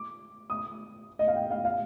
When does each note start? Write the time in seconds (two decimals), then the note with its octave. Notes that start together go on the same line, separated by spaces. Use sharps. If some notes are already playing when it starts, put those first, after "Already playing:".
Already playing: D6
0.50 D#6
1.19 D#5
1.28 F5
1.36 G5
1.51 F5
1.65 F5